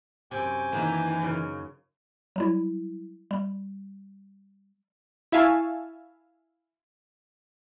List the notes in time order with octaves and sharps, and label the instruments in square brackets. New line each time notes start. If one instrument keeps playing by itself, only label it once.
[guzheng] F#2 C3 [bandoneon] G5 G#5 D6
[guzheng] D#3 A#3 [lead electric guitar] E3
[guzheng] F#2 C#3
[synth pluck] F#3 G3 E4
G3
[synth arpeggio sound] E4 E5 F5 G#5 A5 C#6